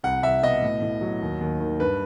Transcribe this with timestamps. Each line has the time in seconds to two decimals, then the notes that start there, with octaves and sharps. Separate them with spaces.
0.04 C2 F#5
0.23 C2 E5
0.43 B2 D#5
0.62 A2
0.82 A2
1.01 F#3
1.21 D#2
1.41 D#2
1.60 D#3
1.80 G2 B4